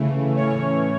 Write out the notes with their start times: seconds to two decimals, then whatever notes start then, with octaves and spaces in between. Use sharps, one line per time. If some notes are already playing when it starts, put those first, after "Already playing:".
Already playing: C#3 E3 A3
0.36 A2 E3 A3 C#4 C#5